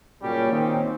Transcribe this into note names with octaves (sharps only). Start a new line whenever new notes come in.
A#2 C#3 F#3 G3 C#4 G4
D#3 A#3 C4 C#4 D#4